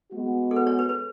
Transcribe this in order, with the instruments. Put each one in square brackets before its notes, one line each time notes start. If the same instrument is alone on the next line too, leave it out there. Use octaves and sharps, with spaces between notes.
[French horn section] G#3 B3 F#4
[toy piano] A4
B4
C#5
B4
B4